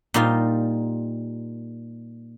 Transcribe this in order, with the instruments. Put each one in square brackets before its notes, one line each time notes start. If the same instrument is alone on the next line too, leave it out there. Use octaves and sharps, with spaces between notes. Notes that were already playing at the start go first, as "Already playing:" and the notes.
[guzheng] A#2 G3 D#4 F4